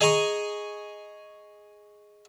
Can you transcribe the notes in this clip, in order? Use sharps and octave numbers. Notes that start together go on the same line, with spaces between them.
G#4 D#5 G#5 A#5 C#6 D#6